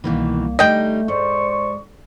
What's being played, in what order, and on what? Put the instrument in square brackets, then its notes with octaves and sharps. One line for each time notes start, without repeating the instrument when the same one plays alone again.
[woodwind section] C2 A#3 [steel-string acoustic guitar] B2 D#3 E3
[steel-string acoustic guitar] D3 G3 D#4 [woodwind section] A3 [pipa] D#5 G5
[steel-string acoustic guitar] G#2 [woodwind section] C5 D5 C#6